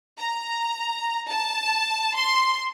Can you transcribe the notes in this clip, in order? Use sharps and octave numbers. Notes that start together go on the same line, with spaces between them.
A#5
A5
C6